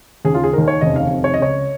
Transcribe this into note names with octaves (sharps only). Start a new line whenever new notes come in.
D#2 C#3 G#4
F4
G#4
D#2 D#3 A#4
C#5
F1 D#2 C#3 D#5
F5
F1 F2 D#3
C#5
D#5
C#2 C#3 C#5